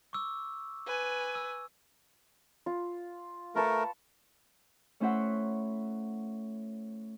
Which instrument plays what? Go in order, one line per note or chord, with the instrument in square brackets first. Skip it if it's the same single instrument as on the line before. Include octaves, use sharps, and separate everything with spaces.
[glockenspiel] C#6 D6 E6
[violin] B4 G#5
[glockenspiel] E6
[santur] F4
[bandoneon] A3 A#4 [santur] B4 A5 C#6
[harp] A3 C#4 E4 C5 E5 F#5